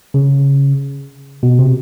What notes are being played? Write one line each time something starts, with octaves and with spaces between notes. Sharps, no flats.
C#3
B2
C3